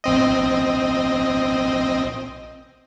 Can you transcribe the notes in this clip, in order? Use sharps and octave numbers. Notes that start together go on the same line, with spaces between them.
A#1 C4 D#5